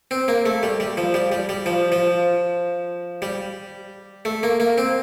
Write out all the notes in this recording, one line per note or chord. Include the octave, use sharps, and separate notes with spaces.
C4
A#3
A3
G3
G3
F3
G3
G3
G3
F3
F3
G3
A3
A#3
A#3
C4